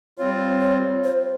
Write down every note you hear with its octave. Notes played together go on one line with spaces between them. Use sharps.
G3 C4 F4 C#5
C#5
C5